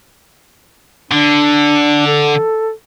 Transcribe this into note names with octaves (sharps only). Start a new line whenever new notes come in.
D3 D4
A4